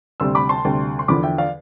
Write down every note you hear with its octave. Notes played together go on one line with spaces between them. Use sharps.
D2 C3 G3 C6 E6
B5 D6
A5 C6
D2 C3 G3
C6
E2 D3 F3 B5 D6
E5 G5
D5 F5